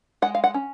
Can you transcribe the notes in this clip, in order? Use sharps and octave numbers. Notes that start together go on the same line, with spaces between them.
G#3 F#5
F5
F#5
C#4